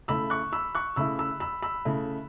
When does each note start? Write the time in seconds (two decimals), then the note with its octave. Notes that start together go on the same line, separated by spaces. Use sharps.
0.08 C#3 A3 E4 B5 E6
0.30 C#6 F#6
0.53 B5 E6
0.75 C#6 F#6
0.96 C#3 A3 E4 B5 E6
1.19 B5 E6
1.40 B5 E6
1.63 B5 E6
1.85 C#3 A3 E4